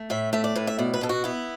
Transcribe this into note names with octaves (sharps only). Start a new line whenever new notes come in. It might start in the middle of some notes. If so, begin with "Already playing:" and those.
Already playing: A3
A2 E5
A3 E5
D5
A2 B4
E5
B2 D5
B4
B2 A4
F#4
B3 E4